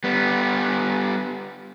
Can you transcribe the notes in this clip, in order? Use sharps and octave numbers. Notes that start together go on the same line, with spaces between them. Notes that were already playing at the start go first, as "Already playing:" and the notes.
G3 B3